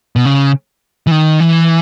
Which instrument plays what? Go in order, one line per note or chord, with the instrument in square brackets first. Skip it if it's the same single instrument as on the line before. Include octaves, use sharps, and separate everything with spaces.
[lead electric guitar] B2
C#3
E3
D#3
E3